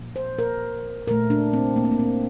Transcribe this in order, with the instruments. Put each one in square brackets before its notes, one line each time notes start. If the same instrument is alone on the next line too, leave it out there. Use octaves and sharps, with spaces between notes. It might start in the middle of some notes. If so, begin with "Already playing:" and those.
Already playing: [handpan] A#2 F3 A#3
C5
A#4
A#2 A3 A#4
D4
C4
A#3
C4
A#3
C4